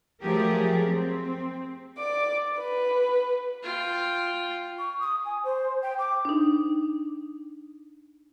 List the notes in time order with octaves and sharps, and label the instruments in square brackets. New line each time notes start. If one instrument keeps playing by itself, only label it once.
[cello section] F3 F#3 A3 G4 G#4 A#4
C4
[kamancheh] D5 D6
B4
[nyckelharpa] F4 G5
[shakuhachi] C#6
D#6
G#5
C5
G5
D6
[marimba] D4 D#4